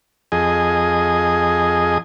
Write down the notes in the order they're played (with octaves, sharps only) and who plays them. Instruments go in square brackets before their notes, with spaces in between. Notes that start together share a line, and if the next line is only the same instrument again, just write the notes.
[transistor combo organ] F2 G#4 D#5